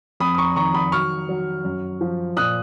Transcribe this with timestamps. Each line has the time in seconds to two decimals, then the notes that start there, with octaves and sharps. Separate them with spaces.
0.20 F2 B5 D#6
0.34 D#6
0.38 A#5 C#6
0.56 D#3 A#5 C#6
0.74 B5 D#6
0.92 F#3 C#6 F6
1.29 F#3
1.64 F#2
2.01 F3
2.36 A#2 D#6 F#6